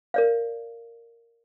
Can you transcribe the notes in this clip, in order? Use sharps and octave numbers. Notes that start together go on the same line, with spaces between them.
A#4 D5 F5